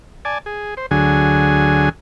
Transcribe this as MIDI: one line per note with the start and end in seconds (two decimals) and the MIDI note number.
0.25 0.38 74
0.25 0.38 80
0.25 0.38 81
0.46 0.74 68
0.77 0.86 72
0.91 1.89 38
0.91 1.89 50
0.91 1.89 54
0.91 1.89 68
0.91 1.89 80